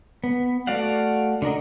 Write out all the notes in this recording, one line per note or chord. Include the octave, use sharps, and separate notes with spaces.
B3
A3 F#4 D5 F5 F#5
D3 D4 A#4 D#5